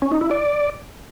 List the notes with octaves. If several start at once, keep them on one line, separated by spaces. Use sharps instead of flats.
C#4
D#4
E4
D5